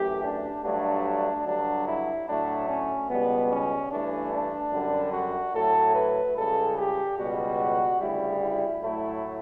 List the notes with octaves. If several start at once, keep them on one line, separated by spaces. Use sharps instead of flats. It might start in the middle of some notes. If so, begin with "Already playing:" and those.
Already playing: F#2 E3 A3 G4
D4
G2 F#3 A3 D4
G2 D3 F#3 D4
E4
A2 F#3 A3 D4
C#4
C#2 B2 G3 B3
C#4
G2 E3 A3 D4
D4
F#2 D3 G3
F#4
A2 F#3 A3 A4
B4
C#2 C#3 G3 A4
G4
C#2 B2 G3 F#4
D2 C#3 G3 E4
E4
A2 F#3 A3 E4